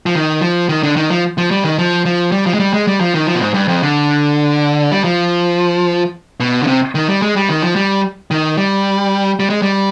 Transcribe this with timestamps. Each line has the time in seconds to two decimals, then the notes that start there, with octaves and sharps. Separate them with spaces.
0.06 F3
0.15 D#3
0.41 F3
0.69 D#3
0.83 D3
0.96 D#3
1.10 F3
1.38 F3
1.51 G3
1.64 D#3
1.78 F3
2.05 F3
2.32 G3
2.46 F3
2.54 G#3
2.60 G3
2.74 G#3
2.87 G3
3.01 F3
3.14 D#3
3.27 F3
3.35 B2
3.41 G#2
3.54 G2
3.68 F2
3.82 D3
4.92 G3
5.04 F3
6.40 B2
6.62 D3
6.67 C3
6.95 D#3
7.09 G3
7.22 G#3
7.36 G3
7.49 D#3
7.62 F3
7.76 G3
8.31 D#3
8.57 G3
9.40 G3
9.50 G#3
9.62 G3